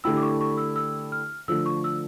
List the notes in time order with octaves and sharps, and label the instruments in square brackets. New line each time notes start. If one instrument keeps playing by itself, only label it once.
[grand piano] D3 A3 E4 G4 [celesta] E6
[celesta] D6
C#6
C#6
E6
E6
F6
[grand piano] D3 F3 A3 [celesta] E6
[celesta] C#6
E6